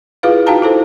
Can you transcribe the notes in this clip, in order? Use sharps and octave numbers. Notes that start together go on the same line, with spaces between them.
E4 F4 G#4 B4 F5
D#4 F#4 F5 G5 A5 A#5
E4 A4 C5